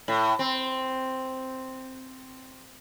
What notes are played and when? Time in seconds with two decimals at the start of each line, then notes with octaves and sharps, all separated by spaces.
0.08 A2
0.39 C4